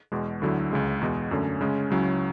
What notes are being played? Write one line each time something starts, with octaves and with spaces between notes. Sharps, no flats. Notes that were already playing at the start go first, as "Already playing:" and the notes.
E2 B2 G#3
D2 D3 F#3 A3 E4
C#2 C#3 G#3
E2 B2 G#3
F#2 D3 A3 C#4
C#3 G#3 C#4
C#2 C#3 F#3 C#4 E4